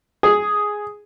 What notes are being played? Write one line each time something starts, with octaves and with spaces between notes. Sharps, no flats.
G#4